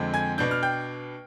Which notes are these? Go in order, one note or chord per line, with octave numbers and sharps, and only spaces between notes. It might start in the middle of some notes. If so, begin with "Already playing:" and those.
Already playing: F2 D3 G#3 C4
G#5 G#6
B2 B3 D4 G6
F6
G5 G6